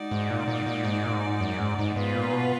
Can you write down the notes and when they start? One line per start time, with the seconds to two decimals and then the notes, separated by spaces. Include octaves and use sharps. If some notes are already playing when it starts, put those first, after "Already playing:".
Already playing: G#3 D#4 F#4 D5
0.11 G#2
0.30 A#2
0.48 A#2
0.66 A#2
0.85 G#2
1.05 A#2
1.13 G#2
1.40 F#2
1.60 G#2
1.79 G#2
1.96 G#2 B3 F4 B4
2.15 A#2
2.33 B2